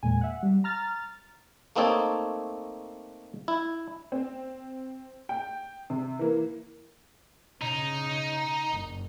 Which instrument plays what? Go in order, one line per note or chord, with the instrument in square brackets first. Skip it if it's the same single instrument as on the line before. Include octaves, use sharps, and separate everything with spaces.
[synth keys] E2 A#2 G#3 G#5
E5 F#5
G3
A#5 F6 A6
[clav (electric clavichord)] A3 A#3 C4 D#4 A4 C#5
E4
[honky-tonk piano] C4
G5
C3
E3 A#3
[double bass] C#3 [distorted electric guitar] D#4
[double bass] F#1